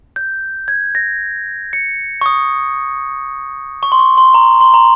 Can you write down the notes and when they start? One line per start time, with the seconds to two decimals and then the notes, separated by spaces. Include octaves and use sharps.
0.16 G6
0.68 G#6
0.95 A#6
1.73 C#7
2.21 C#6
2.26 D#6
3.83 C#6
3.92 C6
3.99 C#6
4.18 C6
4.34 A#5
4.61 C6
4.74 A#5